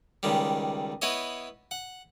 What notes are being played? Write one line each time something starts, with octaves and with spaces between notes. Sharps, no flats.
C#2 D#3 G3
B3 E4 C#5 D#5
F#5